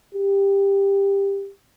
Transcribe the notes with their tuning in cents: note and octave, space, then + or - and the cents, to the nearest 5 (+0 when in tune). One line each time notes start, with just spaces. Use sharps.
G4 +15